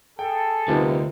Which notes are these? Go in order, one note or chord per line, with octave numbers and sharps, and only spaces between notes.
G#4 A4 G5
D2 C3 G3 B3 D#4 F4 A#4